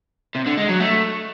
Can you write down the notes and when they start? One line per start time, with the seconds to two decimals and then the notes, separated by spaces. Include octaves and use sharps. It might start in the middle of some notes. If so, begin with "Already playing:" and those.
0.35 C3
0.46 D3
0.57 G#3
0.69 F#3
0.80 A3